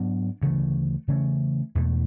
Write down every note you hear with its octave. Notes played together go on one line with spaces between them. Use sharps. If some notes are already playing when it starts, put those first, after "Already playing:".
Already playing: G#2 F#3 B3 D4
D2 C#3 E3 A3
C#3 E3 A3 C#4
E2 B2 A3